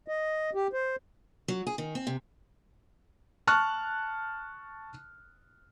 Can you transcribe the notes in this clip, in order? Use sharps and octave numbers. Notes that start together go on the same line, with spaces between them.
D#5
G4
C5
F#3
G#4
D#3
C4
C3
A5 C#6 F6 F#6